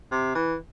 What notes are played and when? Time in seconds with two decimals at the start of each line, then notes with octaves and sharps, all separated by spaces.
0.12 C3
0.35 E3